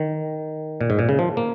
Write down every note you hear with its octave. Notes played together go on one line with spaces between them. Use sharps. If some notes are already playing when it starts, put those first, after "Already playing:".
Already playing: D#3
A#2
G#2
A#2
C#3
F3
A#3